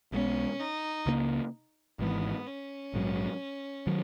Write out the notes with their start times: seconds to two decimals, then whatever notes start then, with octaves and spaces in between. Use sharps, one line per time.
0.12 B1 A#2 G#3 B3 C#4
0.60 D#4
1.06 C#2 C#3 F#3 A#3
1.99 G#1 G#2 E3 B3
2.47 C#4
2.94 A#1 G#2 D#3 F#3
3.87 D#3 F#3